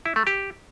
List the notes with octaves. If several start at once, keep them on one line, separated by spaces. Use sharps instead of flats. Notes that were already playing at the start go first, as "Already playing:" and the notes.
E4
A3
G4